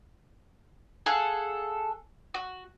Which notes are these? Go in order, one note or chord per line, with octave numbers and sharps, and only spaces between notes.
G#4 A4 F5 F#5
F#4